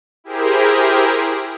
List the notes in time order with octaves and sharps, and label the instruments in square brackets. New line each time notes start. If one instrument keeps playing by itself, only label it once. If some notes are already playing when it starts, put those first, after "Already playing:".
[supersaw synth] E4 G4 G#4 A#4 C5